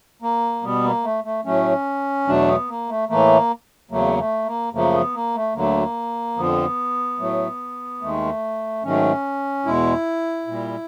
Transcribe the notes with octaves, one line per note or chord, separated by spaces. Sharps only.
A#3
B2 G3 B3
A#3
A3
A3
A2 F#3 A3 C#4
E2 B2 F#3 A3 D4
B3
A#3
A3
A2 E3 A3 A#3
E2 C#3 F#3 A3 A#3
A3
A#3
F#2 C#3 F3 A3 A#3
B3
A#3
A3
D2 D3 F#3 A3 A#3
F2 D3 F3 B3
A2 F#3 A3
D#2 D#3 G#3 A3
G#2 D#3 F#3 A3 C#4
E2 B2 G#3 E4
A#2 G3